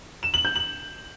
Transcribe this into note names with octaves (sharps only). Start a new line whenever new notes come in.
E7
F#7
G6
F#7